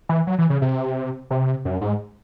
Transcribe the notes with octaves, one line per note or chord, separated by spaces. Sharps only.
E3
F#3
E3
C#3
C3
C3
F#2
G#2